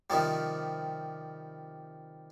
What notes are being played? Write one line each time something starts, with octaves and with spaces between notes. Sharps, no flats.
C3 D#3 F3 G3